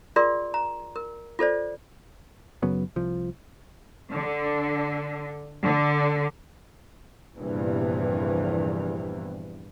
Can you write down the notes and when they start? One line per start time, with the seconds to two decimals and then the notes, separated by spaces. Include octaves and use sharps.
0.16 F4 G#4 A#4 D5 C6
0.54 A#5
0.96 A#4
1.39 F4 A4 C5 D5
2.62 F#2 C#3 F#3 B3
2.96 C2 F3
4.14 D3
5.63 D3
7.37 A#1 E2 G2 C3 E3